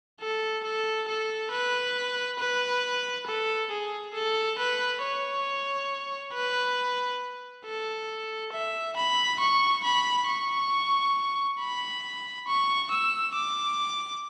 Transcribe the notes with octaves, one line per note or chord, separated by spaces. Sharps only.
A4
A4
A4
B4
B4
A4
G#4
A4
B4
C#5
B4
A4
E5
B5
C#6
B5
C#6
B5
C#6
E6
D6